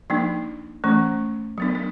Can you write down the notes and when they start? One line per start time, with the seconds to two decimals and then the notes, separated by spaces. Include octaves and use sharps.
0.10 F3 A#3 D4 D#4
0.84 E3 A3 C#4
1.58 F#3 B3 D4
1.75 D4